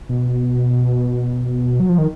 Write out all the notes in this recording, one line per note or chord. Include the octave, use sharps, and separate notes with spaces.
B2
F#3
F3
D#3